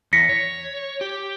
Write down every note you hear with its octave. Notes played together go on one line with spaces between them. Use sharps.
E2 A#6 B6 C#7
C#5
G4